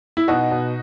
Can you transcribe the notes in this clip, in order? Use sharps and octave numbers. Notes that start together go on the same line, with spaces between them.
E4
B2 D#4 F#4
B2